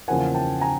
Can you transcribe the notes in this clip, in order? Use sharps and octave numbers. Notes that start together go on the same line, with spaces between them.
E2 C#3 F3 A#3 F#5 G#5
G5 A5
G#5 A#5